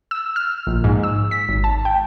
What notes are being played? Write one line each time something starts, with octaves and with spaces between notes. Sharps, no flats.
E6
F6
A#1
G#2
E6
B6
G#1
A5
G5